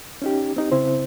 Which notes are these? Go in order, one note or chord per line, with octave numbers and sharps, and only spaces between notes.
C#4 D#4 G4
C4 D#4 G4
C#3 C4 E4 C5